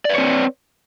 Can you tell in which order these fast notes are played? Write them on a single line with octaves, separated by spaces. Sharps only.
D5 B4 C#5 C4